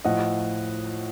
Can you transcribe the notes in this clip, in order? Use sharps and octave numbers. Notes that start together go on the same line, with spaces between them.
A2 F3 D#5 F#5